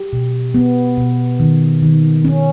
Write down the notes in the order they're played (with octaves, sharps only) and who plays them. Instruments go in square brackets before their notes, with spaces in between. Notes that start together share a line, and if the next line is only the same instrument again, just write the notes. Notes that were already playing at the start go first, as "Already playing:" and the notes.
Already playing: [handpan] G4
B2
B3
B2
D#3
D#3
C#4